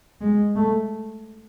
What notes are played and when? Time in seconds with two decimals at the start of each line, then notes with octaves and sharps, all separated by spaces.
0.21 G#3
0.56 A3